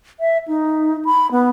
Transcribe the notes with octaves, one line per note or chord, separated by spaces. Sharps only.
E5
D#4
B5
B3